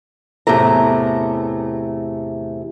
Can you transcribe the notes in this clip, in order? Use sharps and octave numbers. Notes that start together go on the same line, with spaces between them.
E2 A2 C3 A3 A#5